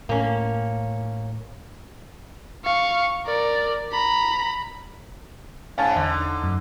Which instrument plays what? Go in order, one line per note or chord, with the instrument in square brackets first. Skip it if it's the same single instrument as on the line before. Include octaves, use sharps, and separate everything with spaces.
[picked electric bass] A2 [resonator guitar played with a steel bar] A#3 C#4
[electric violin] F5 C#6
A#4 D5
A#5 B5
[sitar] G#2 C#4 [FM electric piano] F5 G#5 A5
[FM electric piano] E2 [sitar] D3 D#4
[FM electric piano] F#2